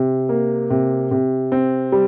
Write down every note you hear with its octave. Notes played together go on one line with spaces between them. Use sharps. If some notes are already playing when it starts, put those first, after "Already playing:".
Already playing: C3
A#3
C3
C3
C4
G3